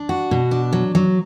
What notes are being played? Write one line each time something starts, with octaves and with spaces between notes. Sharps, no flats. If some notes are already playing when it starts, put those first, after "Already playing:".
Already playing: D4
F#4
B2
D4
F#3
F#3